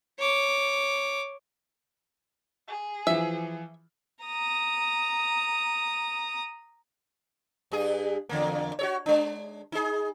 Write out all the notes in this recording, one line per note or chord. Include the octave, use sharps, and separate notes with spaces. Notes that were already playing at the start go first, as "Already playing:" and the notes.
C#5 D6
G#4
E3 F3 E5
A#5 D#6
G2 G#4
E2 D3 A#3
F#4 A4 C#5
G#3 D4
D#4 G#4